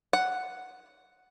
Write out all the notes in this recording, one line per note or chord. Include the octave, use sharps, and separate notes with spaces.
F#5